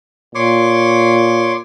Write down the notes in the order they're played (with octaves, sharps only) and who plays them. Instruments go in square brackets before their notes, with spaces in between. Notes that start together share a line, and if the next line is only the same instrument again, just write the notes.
[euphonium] A#2 [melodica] C#5 C6 D6